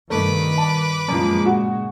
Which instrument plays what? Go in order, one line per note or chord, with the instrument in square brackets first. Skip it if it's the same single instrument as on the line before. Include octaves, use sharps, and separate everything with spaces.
[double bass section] G2 C3 D#3 [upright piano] A3 [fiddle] B4 D6
[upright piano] A5
[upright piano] F#2 F3 [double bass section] A#2 C#3 G#3
[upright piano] F#4